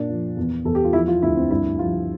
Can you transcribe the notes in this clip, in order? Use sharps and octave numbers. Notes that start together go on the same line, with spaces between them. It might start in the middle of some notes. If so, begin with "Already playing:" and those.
Already playing: A#2 D4
F3
E2
E2 A4
G4
F4
F3 E4
F4
D2 E4
C4
G2 E4
F3 F4